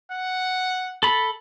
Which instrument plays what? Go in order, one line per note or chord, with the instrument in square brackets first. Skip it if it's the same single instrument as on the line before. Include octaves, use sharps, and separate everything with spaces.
[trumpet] F#5
[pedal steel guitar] A4 B5